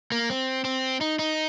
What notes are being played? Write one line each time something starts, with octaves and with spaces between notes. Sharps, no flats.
A#3
C4
C4
D#4
D#4